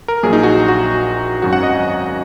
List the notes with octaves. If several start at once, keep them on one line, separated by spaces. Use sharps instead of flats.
A#4
A#1 A#2 F#3 G#4
D#4
F#4
F#4
G#1 F#2 F#3 F#4
F#5
D#5